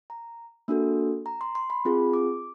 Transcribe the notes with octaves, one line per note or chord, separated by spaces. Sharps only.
A#5
A#3 D4 F#4 A4
A#5
C6
C6
B5
C4 F4 G#4
D6